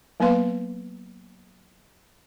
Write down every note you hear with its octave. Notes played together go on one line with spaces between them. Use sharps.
F#3 A#3 B3 B4 F5 C6